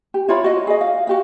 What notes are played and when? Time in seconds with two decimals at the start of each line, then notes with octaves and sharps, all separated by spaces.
0.14 G4
0.28 E4 F4 C#5 B5
0.44 F#4 D#5
0.67 G#4 D#5
0.81 F5
1.07 F#4 G4 F5